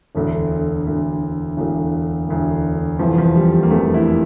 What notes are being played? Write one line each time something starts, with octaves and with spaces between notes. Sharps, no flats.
E1 D2 D3
E1 D2 D3
E1 D2 D3
E1 D2 D3
F1 E2 C3 E3 F3
F3
G3
A#3
F1 E2 C3 E3 A3
E4